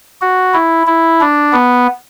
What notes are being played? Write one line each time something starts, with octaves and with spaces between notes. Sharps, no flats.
F#4
E4
E4
D4
B3